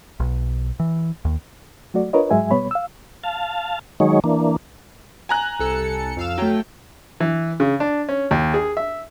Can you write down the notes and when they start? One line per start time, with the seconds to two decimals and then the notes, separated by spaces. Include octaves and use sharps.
0.20 B1
0.80 E3
1.25 D#2
1.94 F#3 A3 F#4 D5
2.13 D4 F4 A#4 B4 C#5 D#5
2.30 G#2 F#3 G#3 E5 G#5
2.51 B2 G3 B3 C#5 B5
2.71 F5 E6
3.24 F5 A5
4.00 D#3 F#3 G#3 D#4 C#5
4.24 E3 A#3 D4
5.29 G#5 A#5 F#6
5.59 C2 A4 C#7
6.16 F2 F5 E6
6.38 F#3 A3 G5
7.20 E3
7.60 C#3
7.80 D4
8.09 C#4
8.31 D#2
8.54 G#4
8.77 E5